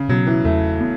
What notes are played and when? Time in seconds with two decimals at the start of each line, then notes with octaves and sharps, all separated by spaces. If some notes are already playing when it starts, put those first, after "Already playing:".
Already playing: C#3
0.09 B2 F#3 B3
0.27 E3
0.45 E2 A3
0.81 B3